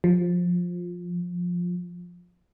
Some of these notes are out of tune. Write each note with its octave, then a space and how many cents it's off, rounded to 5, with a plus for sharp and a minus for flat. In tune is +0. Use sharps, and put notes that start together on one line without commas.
F3 +15